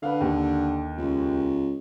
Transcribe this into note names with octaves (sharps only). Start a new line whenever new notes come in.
D3 B4 F5
D#2
C#2